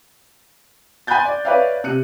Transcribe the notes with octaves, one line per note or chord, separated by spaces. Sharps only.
G#5 B5 C6 F#6 G6 A6
D5
B4 C#5 D5 E5 F5
C3 F#6 C#7 D#7